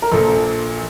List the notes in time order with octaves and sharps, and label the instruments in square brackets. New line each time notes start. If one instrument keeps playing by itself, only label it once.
[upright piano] A#4
[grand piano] A#1 A#2 F3 [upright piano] A4